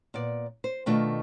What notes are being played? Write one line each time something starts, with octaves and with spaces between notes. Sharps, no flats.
A#2 B3 D5
C5
B2 D#3 A3 D4 F4